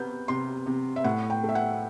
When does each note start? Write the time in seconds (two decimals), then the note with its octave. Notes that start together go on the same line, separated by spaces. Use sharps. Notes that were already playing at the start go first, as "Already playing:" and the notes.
Already playing: C3 B3 G6
0.28 C3 C6
0.66 C3
0.96 E5
1.04 A2 F#5
1.30 G5
1.43 A3
1.49 E5
1.55 F#5